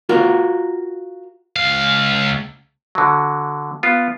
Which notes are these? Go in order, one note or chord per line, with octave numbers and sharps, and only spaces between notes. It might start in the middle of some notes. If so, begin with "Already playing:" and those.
F4 F#4 A#4
C#2 F5
D3 F#3
B3 F4